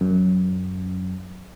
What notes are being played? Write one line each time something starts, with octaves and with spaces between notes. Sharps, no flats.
F#2